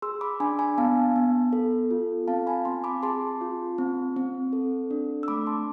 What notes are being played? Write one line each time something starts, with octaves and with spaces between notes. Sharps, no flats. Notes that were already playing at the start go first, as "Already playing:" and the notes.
G#4 C6 E6
B5 D6
D4 G#5 B5
G#5 B5
B3 F5 A5
B3
A4
F4
C4 F5 A5
G#5 B5
C4 A5 C6
B5 D6
G#4 A5 C6
F4
C4
C4
A4
D4
E6
A3 B5 D6
A5 C6